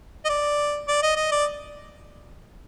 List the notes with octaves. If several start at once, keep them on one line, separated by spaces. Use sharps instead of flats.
D#5
D5
D5
D#5
D#5
D5